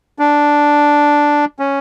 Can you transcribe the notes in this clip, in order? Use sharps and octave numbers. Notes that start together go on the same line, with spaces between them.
D4
C#4